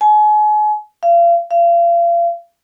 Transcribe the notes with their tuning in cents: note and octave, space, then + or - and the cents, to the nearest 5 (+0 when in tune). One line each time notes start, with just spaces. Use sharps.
G#5 +35
F5 -35
F5 -35